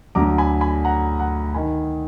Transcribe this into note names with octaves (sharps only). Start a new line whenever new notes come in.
D2 D3 F#3 A#5 D6
G#5 B5
G#5 B5
F#5 A#5
F#5 A#5
D#3 G#5 B5